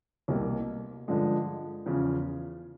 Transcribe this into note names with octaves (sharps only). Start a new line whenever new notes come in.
C2 B2 G3 A#3
G2 D3 F3 G#3
E2 C#3 F3